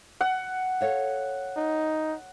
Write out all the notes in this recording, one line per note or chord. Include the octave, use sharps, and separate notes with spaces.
F#5
A4 C#5 F5
D#4